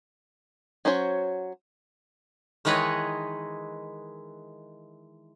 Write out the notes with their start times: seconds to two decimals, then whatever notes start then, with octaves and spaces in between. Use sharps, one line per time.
0.85 F#3 C#4 F#4 C5 C#5
2.65 D#3 E3 G#3 B4 C#5 D#5